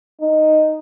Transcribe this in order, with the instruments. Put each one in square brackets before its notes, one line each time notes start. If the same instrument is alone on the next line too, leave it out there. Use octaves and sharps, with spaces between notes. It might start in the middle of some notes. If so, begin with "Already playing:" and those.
[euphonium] D#4